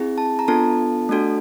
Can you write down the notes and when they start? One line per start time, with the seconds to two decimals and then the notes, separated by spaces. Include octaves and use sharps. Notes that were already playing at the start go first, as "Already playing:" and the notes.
Already playing: C4 E4 G#4
0.18 A5
0.39 A#5
0.48 B3 D4 F4 A4 A5
1.09 A3 D4 F#4 A4